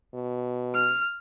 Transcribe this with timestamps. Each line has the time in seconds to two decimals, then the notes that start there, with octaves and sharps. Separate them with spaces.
0.14 B2
0.74 F6